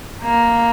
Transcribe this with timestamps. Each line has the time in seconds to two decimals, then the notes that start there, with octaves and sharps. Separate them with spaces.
0.22 A#3